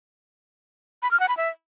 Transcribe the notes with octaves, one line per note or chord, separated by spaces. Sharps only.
B5
F6
F#5
B5
E5